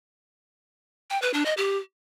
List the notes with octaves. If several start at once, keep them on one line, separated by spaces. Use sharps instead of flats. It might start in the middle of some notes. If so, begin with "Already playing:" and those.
G5
B4
D4
D#5
G4